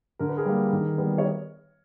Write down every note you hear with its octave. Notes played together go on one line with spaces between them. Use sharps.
D3 A#4
B4
G#4 A#4
G3 A#3
D#3
G3 B3
C#5